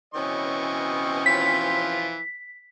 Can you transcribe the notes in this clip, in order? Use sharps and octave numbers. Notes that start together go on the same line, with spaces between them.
B2 E3 C4 C#4 D#5 C#6
E3 F3 F4 B6